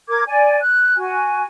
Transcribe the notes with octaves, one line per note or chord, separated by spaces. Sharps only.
A#4 D6 G#6
D5 G#5
F#6
F#4 G#5